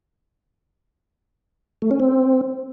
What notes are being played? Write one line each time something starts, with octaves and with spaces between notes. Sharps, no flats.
A3
C#4
C4